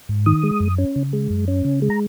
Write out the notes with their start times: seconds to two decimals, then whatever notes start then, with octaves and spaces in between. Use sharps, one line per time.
0.09 G#2
0.26 D#3 D#6
0.44 G#3
0.60 F#2
0.78 C#4
0.96 C#3
1.13 G#3
1.30 F#2
1.48 C#4
1.65 C#3
1.82 G#3
1.90 A#5